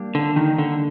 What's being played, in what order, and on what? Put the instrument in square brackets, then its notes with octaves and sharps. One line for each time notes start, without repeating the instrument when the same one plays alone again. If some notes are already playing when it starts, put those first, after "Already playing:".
Already playing: [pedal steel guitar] G3 A#3 D4 G4
[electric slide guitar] D3
D#3
D3